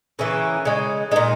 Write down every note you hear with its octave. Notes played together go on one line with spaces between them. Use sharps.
C#3 E3 A#3 C#4
C#3 G#3
A#2 G#3 D#4